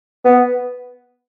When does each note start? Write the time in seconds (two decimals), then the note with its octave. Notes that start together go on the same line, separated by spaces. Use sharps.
0.25 B3